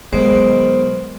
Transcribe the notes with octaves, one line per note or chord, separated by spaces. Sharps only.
B2 D#3 F#3 G#3 C5